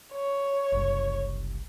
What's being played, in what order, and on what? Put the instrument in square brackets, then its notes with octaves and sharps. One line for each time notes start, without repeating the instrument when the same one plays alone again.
[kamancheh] C#5
[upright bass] F#1 C2